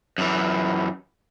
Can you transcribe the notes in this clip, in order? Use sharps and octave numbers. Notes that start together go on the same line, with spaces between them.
F#2 E3